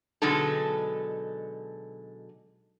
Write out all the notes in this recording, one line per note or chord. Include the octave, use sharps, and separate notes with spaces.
B2 D3 F#3 G#3 D#4 A4